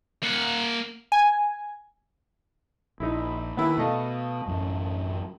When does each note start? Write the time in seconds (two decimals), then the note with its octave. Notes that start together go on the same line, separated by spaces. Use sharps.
0.23 A#3 F#5
1.12 G#5
3.00 A#1 D#4 E4
3.57 D#3 A#3 B3 E4
3.78 B2 A3 D#5 F5
4.47 A1 F#2